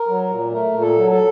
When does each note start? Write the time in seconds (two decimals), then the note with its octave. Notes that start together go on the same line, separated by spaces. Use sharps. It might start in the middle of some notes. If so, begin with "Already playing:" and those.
Already playing: A#4
0.08 F#3
0.30 A#2
0.52 A3 A#4
0.74 A#2
0.81 A4
0.96 F#3
1.11 A4